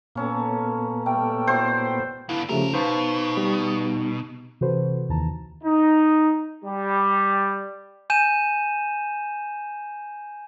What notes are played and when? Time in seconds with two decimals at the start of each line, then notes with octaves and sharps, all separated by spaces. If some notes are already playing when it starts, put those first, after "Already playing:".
0.16 A#2 A#3 B3 C#4 A4
1.06 G3 A3 A#4 G5
1.47 E4 F#4 C5 D5
2.29 D3 B3 E4 F5
2.49 G2 C#3 F3 A3 G4 A#4 E5
2.74 B2 D#4 B4 C5 F5 A5
3.37 G3
4.61 C3 E3 F#4 A4 B4 C5
5.09 D#2 D#3 E3 A5 A#5
5.64 D#4
6.64 G3
8.10 G#5 G6 D#7 E7